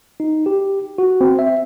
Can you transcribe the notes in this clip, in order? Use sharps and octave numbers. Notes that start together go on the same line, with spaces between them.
D#4
G4
F#4
C4
E5